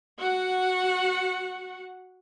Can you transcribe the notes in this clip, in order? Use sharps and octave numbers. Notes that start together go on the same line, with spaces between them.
F#4 F#5